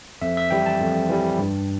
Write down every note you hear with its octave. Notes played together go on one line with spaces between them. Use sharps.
F2 E5
E5
E3 G3 G5
A5
F2
E3 G3
G2